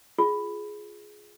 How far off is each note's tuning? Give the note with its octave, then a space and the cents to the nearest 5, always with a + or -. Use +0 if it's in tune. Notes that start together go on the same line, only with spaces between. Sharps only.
F4 +0 G#4 +10